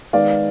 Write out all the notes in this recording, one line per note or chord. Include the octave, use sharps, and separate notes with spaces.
D#3 G#3 B3 D5 F5